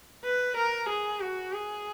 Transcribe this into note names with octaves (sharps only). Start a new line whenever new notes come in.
B4
A#4
G#4
F#4
G#4